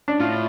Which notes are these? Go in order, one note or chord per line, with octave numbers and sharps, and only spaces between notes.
D4
A2 F4